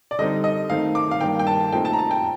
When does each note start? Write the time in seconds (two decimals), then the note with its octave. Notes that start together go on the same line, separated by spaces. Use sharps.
0.11 D5
0.19 D3 G3 C4 D#4 D#5
0.44 D#5
0.70 D#3 A3 C4 D#4 F5
0.95 D6
1.11 F5
1.21 G2 D#3 A#3 D4 G5
1.39 G5
1.47 A5
1.72 A#2 A3 C4 D#4 G5
1.85 A5
1.93 A#5
1.99 A5
2.11 G5